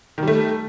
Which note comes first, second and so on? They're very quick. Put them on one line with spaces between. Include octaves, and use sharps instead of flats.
D#3 G3 A3